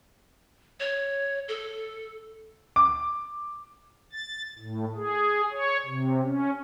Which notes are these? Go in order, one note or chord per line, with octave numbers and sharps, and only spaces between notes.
C#5
A4
D6
A6
A2
G#4
C#5
C3
C#4